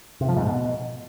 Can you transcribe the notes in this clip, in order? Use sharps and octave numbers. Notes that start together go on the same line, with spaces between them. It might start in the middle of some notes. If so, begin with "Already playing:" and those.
C3
F3
G#2
B2